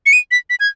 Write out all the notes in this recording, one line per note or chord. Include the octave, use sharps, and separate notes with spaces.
C#7
D#7
B6
B6
G#6